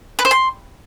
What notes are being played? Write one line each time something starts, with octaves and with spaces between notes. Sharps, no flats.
B4
C5
C6